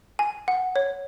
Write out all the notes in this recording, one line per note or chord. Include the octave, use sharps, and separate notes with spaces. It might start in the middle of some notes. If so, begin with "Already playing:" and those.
G#5
F#5
C#5